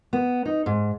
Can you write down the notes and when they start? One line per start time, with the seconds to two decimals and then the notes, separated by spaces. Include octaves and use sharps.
0.13 B3
0.45 D#4
0.66 G#2